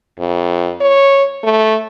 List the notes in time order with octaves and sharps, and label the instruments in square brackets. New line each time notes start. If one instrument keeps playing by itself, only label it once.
[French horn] F2
C#5
A3